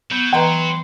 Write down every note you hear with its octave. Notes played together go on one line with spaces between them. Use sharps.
F#3 B3 G6
E3 B4 D#5 G5 A#5 C6